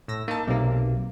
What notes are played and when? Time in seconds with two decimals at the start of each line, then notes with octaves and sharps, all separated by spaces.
0.08 A2 E6 A#6
0.28 A#3 D#4 A5
0.47 B1 C3 A#3